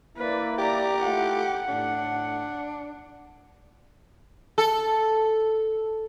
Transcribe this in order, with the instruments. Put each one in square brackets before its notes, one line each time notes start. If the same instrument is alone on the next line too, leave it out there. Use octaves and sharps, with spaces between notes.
[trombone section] A#3 E4 [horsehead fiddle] B4 D5
[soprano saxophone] G4 [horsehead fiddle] D5 A#5
[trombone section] A3 E4 F4 [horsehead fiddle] F#5
[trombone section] A2 [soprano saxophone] D4
[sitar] A4